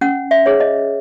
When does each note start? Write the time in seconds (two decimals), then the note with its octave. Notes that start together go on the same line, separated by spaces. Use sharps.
0.01 C#4 F#5
0.31 E5
0.46 G#4 C#5
0.60 D#5